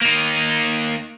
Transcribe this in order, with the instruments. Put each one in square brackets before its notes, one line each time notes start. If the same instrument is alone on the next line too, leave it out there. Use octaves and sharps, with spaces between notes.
[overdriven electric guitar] A#3 D#4